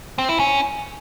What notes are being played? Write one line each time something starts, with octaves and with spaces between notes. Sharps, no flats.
C4
E4
C#4